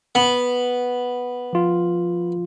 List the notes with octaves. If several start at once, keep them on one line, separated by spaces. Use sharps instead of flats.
B3
F3 F4